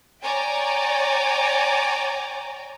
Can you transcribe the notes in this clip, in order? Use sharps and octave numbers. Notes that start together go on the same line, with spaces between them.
C#5 D5 G5 G#5 A#5